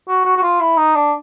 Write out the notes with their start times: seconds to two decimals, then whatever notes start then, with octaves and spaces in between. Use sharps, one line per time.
0.08 F#4
0.25 F#4
0.37 F#4
0.43 F4
0.60 E4
0.77 D#4
0.95 D4